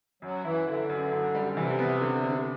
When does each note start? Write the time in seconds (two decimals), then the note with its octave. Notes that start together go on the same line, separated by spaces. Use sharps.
0.22 F#2 F#3
0.44 E3 E4
0.67 D3 E4
0.90 F#2
1.12 F#2
1.35 G3
1.57 C3 E3
1.79 B3
2.01 D3
2.24 D3